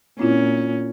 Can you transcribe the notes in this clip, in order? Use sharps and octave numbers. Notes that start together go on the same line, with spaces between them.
A#2 C4 C#4 E4 F4